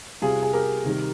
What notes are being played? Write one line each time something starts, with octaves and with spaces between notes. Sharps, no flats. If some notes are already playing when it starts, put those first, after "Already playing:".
C3 G3 F4 G#4
G#4
G4 A#4
C3 D#3 G3